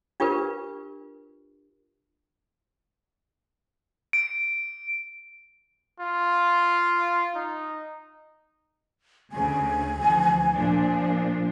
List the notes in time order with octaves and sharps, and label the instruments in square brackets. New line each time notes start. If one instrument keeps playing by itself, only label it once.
[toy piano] D4 F4 G4 A#4 B4
[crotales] D7
[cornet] F4
D#4
[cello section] D2 C#3 [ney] G#5
[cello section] D2 E3 F3
A#2 F3 D4